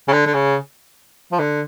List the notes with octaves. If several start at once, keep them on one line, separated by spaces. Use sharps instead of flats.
C#3
D3
D3
C#3
F3
D3